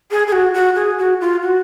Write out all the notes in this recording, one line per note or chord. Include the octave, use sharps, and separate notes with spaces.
G#4
G#4
F#4
F#4
G#4
F#4
F4
F#4